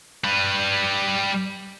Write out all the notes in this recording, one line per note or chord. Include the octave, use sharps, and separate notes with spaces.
G3 B4